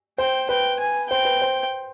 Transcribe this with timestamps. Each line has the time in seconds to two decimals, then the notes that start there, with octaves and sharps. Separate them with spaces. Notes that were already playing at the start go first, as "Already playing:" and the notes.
0.18 C5 G5
0.49 B4 G5
0.80 G#5
1.10 C5 G5
1.25 B4
1.42 C5